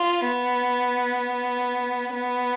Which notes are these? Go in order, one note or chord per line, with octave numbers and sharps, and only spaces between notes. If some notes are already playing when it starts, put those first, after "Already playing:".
Already playing: F4
B3
B3